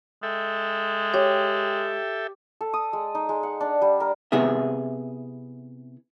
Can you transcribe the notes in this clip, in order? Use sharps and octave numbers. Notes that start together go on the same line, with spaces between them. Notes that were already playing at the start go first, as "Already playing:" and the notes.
G#3 A4 E5 G5
G4 C#5
A4
D#6
G#3
D#4
G#3
F#5
D4
G3
A#4
C3 B3 E4 G#4 E5